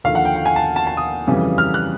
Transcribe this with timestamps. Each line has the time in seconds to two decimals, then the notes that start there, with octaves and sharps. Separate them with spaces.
0.04 D#2 D3 F3 F5
0.15 F#5
0.25 G5
0.36 G5
0.46 G#5
0.56 A5
0.76 A5
0.87 A5
0.97 D#6
1.27 F2 C#3 E3 G3
1.58 F6
1.74 F#6